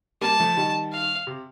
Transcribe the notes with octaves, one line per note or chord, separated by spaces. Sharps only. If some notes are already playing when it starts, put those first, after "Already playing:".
G3 A#3 A5
F3 A3
D#3 G3
F5
C3